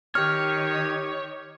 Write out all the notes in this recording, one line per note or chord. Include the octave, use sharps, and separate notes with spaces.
D#3 G4 C#5 F6